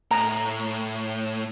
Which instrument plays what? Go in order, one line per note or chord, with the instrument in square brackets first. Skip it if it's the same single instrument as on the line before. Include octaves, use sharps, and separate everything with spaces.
[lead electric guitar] A2 [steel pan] A#5